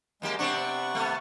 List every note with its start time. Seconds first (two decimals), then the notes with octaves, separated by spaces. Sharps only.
0.22 F#2 G#3 A#3 G4
0.39 C3 B3 C4 D4 F#5 C#6
0.95 A3 B3